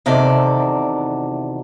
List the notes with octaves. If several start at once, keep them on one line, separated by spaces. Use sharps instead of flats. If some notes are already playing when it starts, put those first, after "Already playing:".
E2 C3 D#3 F#4 A4 D5